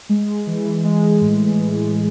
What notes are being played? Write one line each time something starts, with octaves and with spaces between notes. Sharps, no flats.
G#3
E3
G#3
A2
E3